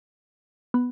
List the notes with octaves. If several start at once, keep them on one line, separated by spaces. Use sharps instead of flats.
B3